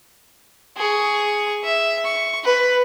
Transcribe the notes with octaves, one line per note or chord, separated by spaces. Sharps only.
G#4 C#6
E5
C#6
B4